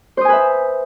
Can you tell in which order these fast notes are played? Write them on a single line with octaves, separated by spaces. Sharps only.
C5 D#6 G#5 B4 E5